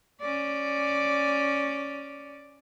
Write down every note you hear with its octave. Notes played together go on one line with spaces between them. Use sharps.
C#4 D5